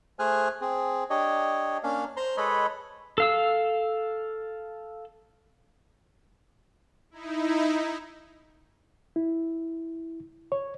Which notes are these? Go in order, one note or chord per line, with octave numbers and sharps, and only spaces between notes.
A3 G#4 C5 G#5 F6 F#6
C4 G#4
D4 G4 C#5 D#5
A#3 C#4 D4 F5
C5 A#5 C6
G#3 A4 B4 C#5 D#5 B5
A4 F5 E6
D#4 E4
E4
C#5